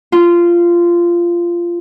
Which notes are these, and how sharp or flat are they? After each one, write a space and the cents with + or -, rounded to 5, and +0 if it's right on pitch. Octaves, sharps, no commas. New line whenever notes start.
F4 -15